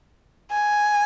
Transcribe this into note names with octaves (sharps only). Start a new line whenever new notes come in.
G#5